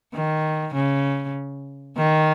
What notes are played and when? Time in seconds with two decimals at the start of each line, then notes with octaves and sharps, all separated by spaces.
0.13 D#3
0.74 C#3
1.97 D#3